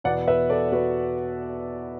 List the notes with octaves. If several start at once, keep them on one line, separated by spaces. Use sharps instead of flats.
E2 B2 B3 D5 F#5
B4 E5
A4 D5
F#4 B4